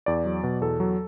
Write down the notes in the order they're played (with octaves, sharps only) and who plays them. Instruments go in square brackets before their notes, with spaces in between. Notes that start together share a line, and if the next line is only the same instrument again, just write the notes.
[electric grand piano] E2 D5
F#3
B2
E2 A4
F#3